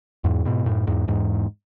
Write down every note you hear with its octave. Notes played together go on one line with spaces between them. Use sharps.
E2 G#2
G#2 B2
F#2 A2
E2 G#2
E2 G#2